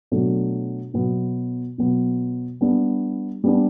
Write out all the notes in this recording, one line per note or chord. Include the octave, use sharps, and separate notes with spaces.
B2 F#3 A3 D4
B2 F#3 B3
B2 F#3 B3
G3 B3 D4
G3 B3 D4